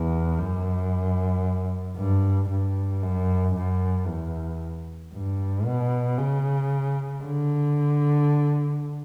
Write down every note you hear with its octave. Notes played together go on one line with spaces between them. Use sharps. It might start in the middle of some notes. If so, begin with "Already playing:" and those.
Already playing: E2
F#2
G2
G2
F#2
F#2
E2
G2
B2
C#3
D3